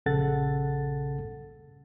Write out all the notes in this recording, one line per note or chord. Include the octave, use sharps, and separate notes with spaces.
A#1 C#3 A4 F#5 A6